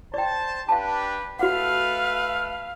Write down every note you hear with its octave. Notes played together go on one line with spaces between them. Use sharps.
C5 D5 G5 A5
D4 G4 B4 F5 A5
A3 F#4 A4 B4 F5 F#5